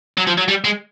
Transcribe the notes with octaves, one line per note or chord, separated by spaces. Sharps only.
F#3
F3
F#3
G3
G#3